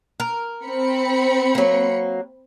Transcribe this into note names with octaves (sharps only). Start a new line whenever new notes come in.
A#4
C4 B5 C#7
F#3 A#3